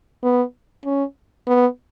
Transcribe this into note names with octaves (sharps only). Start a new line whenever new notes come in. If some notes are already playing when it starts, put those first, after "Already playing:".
B3
C#4
B3